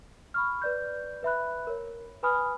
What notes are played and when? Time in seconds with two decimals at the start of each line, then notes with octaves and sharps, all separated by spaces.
0.34 B5 C#6 F6
0.62 B4 D5 G6
1.23 B4 E5 B5 F#6
1.67 A#4 C#5
2.23 B4 G#5 B5 D#6 F6